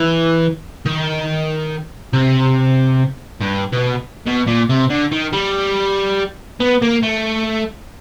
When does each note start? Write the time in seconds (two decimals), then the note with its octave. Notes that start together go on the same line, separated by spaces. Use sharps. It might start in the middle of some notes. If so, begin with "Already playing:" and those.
Already playing: E3
0.86 D#3
2.13 C3
3.41 G2
3.73 B2
4.27 B2
4.47 A#2
4.69 C3
4.90 D3
5.11 D#3
5.33 G3
6.60 B3
6.82 A#3
7.03 A3